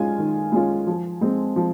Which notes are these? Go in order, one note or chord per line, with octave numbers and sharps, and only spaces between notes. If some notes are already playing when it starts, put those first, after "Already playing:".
Already playing: G#3 C#4 F4 G#5
D#3
G#3 C#4 F4
F3
G#3 C4
F3